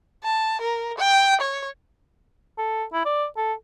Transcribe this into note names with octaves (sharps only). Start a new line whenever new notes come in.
A5
A#4
G5
C#5
A4
E4
D5
A4